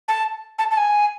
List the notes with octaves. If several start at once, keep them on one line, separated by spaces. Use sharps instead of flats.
A5
A5
A5
G#5